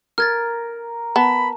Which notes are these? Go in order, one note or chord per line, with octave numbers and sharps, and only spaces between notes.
A#4 F6 G#6 A6
B3 A5 B5